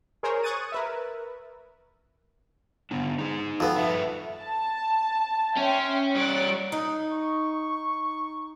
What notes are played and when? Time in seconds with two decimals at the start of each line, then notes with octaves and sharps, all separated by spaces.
0.23 G#4 A#4 C5 C#5
0.43 C#6 D#6 F#6 G#6 A6 D#7
0.72 A#4 B4 E5
2.91 D3 B3 D4
3.18 D#4 G#4
3.60 F2 B3
3.78 G2 E5 A5
4.36 A5
5.57 C#4 E5 G5 C6
6.15 G3 C#5 F#6 A6 D7
6.72 D#4
7.12 C#6